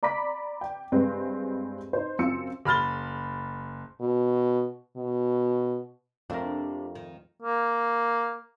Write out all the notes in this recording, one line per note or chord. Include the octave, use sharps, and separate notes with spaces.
D5 A#5 B5 D6 B6
G5
G2 G#3 C4 B4
D#4 C5
F#2 C4 F4 E6 C#7
F#1 B5 F6 A6 G7
B2
B2
F2 C3 A3 D4 A#4
D#3
A#3